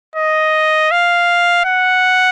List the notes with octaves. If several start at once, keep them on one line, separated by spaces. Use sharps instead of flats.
D#5
F5
F#5